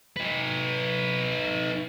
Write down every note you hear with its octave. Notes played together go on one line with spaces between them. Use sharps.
D#4 B4